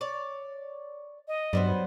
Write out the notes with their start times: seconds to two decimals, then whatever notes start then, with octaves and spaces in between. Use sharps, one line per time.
0.01 C#5 D5
1.28 D#5
1.53 G2 F#3 G3 B3 C5